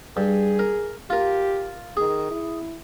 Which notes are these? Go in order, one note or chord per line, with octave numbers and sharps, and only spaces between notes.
G2 G#4
A#4
F4 G4 A#4
D#3 G#4
E4